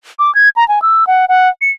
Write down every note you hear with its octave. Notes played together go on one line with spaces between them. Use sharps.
D6
G#6
A#5
G#5
E6
F#5
F#5
C#7